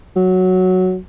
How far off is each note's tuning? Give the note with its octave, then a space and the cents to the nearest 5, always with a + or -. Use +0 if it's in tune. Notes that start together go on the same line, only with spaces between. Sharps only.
F#3 +0